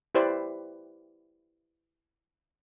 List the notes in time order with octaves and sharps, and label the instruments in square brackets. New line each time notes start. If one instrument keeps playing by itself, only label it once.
[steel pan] E4 G4 B4 C5 D5